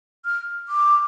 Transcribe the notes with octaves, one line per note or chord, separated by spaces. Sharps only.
F6
D6